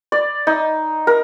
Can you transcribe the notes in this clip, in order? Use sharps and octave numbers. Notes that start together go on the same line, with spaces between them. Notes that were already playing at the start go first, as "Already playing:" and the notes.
D5
D#4
A#4